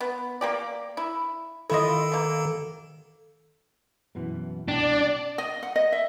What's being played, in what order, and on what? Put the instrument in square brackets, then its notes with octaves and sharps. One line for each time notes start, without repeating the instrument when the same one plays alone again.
[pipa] B3
A#3 G4 D5
E4
[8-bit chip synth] D#3 A4 [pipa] E4 F4 D#5
[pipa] B2 A#3
[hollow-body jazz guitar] F#2 B2 E3
[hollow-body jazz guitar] C2 B2 G5 [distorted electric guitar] D4 [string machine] D5
[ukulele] D#5
F#5
D#5
E5